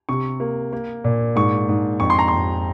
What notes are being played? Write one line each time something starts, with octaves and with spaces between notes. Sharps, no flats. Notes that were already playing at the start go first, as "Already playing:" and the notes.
C3 C#6
A#3
A#3
A#2
G#2 C#6
G#2
F2 C#6
C6
A#5
F2 C6